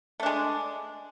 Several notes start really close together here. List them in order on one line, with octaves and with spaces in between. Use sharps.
A3 D4 G#3